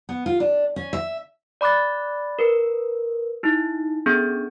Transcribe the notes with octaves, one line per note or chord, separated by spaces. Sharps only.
B3
F4
D4
C#4
E5
D5 B5 D6 F#6 A6
A#4 B4
D#4 E4
B3 C#4 D4 G#4 A4